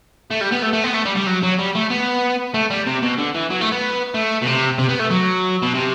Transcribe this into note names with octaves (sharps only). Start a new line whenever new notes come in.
A3
G3
B3
A3
A3
B3
A3
G3
G3
F#3
F#3
G3
A3
B3
A3
G3
C3
B2
D3
E3
F#3
A3
B3
A3
B2
C3
C3
B3
A3
F#3
B2
C3